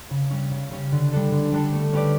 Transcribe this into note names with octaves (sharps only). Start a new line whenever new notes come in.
C#3
G3 C#4
C#3
G3 C#4
D3
G3 D4 A4
D3
G3 D4 A4
A3
C#4 G4 B4 D5